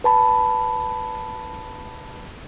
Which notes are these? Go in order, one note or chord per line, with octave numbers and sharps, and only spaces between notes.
B4 A5 B5